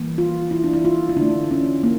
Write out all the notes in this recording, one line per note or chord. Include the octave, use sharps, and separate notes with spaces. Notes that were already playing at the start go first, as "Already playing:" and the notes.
Already playing: E3 G3 A#3
F4
E4
D4
E4
F4
E4
D3 D4
A3
C#4
A#3